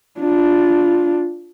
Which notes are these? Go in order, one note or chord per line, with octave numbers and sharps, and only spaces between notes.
D4 F4